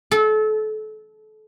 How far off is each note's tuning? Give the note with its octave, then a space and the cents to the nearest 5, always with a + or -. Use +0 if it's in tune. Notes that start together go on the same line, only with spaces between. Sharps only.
A4 -30